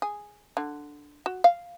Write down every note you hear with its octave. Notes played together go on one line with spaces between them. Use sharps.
G#4
D3
F#4
F5